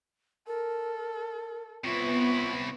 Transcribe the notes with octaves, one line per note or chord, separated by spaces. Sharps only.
A4 A#4
C3 B3 E4 F4 C#5